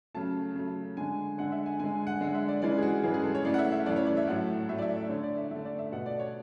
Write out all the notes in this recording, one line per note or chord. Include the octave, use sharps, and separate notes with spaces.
C#3 F#3 A3 A5
C#3 F#3 A3
D3 G#3 G#5
D3 G#3 F#5
E5
G#5
D3 G#3 G#5
G#5
F#5
D3 G#3 F#5
E5
D5
C#3 E3 G#3 D5
G#4
F#4
C#3 E3 G#3 G#4
G#4
A4
C#5
C#3 E3 A3 D5
F#5
E5
E5
C#3 E3 A3 D5
C#5
D5
E5
A2 F#3 A3 F#5
A2 F#3 A3 E5
D5
E5
D5
D3 A3 C#5
D5
E5
D3 A3 E5
D5
E5
B2 A3 F#5
D5
C#5